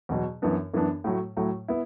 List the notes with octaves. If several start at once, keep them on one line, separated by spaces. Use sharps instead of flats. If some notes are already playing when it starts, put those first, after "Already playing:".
E2 B2 F#3
F#2 E3 B3 D4
F#2 E3 B3 D4
A2 F#3 A3
A2 F#3 A3
B3 E4